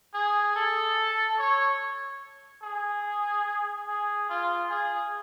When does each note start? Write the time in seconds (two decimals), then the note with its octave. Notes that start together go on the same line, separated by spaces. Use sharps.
0.14 G#4
0.56 A4
1.38 C#5
2.62 G#4
3.88 G#4
4.29 F4
4.71 G#4